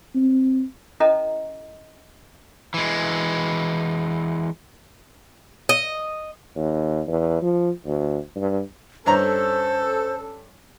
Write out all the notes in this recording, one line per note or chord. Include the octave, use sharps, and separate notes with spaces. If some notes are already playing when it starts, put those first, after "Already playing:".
C4
C#4 E4 A4 B4 D#5 A#5
E3 G#3
D#5
D#2
E2
F3
D2
G2
G2 C#4 A4 C5 C#5 A#5